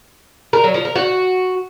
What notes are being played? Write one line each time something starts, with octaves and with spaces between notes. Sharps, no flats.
A#4
F#3
F3
A#4
F#4